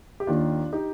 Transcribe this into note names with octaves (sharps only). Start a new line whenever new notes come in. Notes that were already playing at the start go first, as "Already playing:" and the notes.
G4
D#2 D#3 A#3 D4 F4
D#4 G4